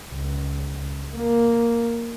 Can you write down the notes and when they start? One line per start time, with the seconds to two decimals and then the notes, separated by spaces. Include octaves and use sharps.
0.10 C#2
1.17 A#3